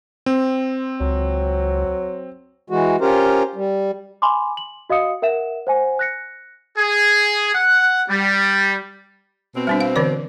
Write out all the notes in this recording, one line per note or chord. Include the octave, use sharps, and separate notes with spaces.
C4
C#2 F#3
E3 G#3 F#4
C#4 F4 G4 A#4 C5
G3
G#5 B5 C6 D6
F#7
F#4 D#5 F5 D#6 C#7
A#4 E5 F#5 E7
C5 F#5 G#5
F#6 A#6 C#7
G#4
F#5
G3
B2 C4
G3 B3 D4
F5
D3 E3 D5